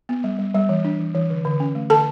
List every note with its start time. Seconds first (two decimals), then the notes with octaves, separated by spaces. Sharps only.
0.09 B3
0.24 G3
0.39 G3
0.55 G3
0.69 E3
0.85 D4
1.00 E3
1.15 E3
1.30 D3
1.45 D3
1.60 C#4
1.75 A3
1.90 D3 A4 A5